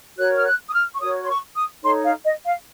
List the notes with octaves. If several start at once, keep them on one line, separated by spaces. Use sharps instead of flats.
F#4 A#4 C#5 F#6
F6
F#6
D#6
F6
C#6
F#4 A#4 C#5 D#6
C6
C#6
D#6
D#4 A4 C#5 C6
F5
D#5
F5